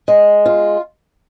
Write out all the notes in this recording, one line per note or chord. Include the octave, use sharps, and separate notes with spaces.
G#3
F4